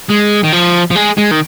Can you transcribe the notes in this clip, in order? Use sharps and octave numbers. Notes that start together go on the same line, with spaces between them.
G#3
D#3
F3
F3
G#3
G#3
D#3